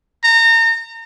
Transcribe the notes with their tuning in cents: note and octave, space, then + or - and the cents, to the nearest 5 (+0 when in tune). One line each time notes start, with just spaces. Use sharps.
A#5 -30